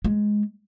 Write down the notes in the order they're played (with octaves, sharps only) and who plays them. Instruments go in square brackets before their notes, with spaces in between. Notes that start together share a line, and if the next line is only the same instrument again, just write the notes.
[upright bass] G#3